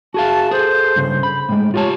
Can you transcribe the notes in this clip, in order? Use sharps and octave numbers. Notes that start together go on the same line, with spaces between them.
F#4 G#4 F5 A5
G#4 A4 C5
G2 C#3
B5
A2 G#3 G5
F4 G4 C#5 A5